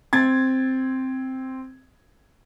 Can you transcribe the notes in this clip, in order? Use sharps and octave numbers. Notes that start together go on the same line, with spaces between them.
C4 G#6 A6